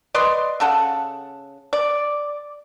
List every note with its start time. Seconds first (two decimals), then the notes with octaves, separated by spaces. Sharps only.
0.14 B4 D5 D#5 C6
0.60 C#3 A4 F#5
1.73 D5